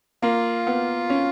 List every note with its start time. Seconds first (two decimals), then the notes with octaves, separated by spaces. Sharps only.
0.22 A#3 F4
0.67 B3
1.10 C#4